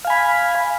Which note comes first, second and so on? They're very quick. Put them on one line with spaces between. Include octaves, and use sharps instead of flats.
F5 G#5 B5